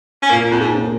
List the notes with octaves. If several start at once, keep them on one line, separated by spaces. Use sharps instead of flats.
C#4
A#2 A#3
F2
G#2
A#3 C#4 G#4